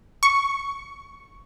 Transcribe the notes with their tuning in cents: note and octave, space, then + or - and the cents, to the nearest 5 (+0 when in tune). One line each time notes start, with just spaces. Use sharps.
C#6 +10